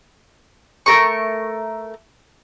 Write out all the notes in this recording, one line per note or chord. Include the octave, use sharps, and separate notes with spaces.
A3 A#4 C#6